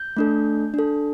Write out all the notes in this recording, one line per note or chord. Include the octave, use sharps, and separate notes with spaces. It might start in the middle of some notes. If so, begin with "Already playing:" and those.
Already playing: G6
A3 D4 A4
D4 A4